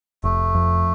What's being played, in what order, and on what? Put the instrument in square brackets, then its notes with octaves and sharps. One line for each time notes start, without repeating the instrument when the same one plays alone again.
[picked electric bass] F1 [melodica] A3
[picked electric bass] F2